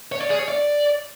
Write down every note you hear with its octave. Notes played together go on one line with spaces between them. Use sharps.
C#5
D5
G#4
C#5
D5